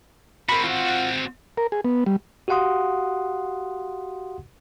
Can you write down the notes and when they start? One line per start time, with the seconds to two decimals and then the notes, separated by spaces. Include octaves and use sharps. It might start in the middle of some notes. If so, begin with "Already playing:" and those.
0.49 C4 F#4 A#4 B5
0.64 F4 F#5
1.57 A#4
1.72 G#4
1.85 B3
2.06 G3
2.48 F#4 G4 F5 F#5 C6 D#6